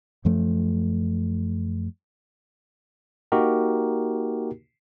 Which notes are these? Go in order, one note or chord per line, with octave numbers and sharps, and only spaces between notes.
F#2 F3 A3
A#3 D#4 F#4 G4 A#4